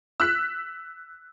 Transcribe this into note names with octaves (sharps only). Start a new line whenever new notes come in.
E6 F#6 B6